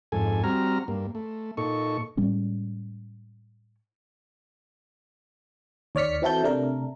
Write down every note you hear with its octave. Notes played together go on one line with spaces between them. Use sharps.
F2 G#2 A4 G#5
G3 C4 F#4 A#5 F6
G2 A#3
A3
A#2 D#4 A4 C#6
A2 G3 G#3 C#4
D#2 C#5 D5 F6 B6 C#7
E3 C4 E4 F#4 A4 G6
C3 A3 D4 A#4